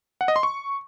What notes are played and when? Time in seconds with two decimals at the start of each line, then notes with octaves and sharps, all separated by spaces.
0.21 F#5
0.28 D#5
0.36 C6
0.43 C#6